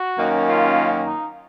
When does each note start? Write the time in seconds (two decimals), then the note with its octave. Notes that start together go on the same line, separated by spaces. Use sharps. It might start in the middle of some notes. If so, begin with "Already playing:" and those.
Already playing: F#4
0.18 F#2 D#3 A#3 C#4
0.47 F4
1.06 D#4